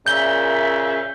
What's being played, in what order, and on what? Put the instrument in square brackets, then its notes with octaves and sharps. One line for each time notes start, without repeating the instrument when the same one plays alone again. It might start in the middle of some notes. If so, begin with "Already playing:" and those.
[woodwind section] A#2 E5 [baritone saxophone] C#3 [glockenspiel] G6 G7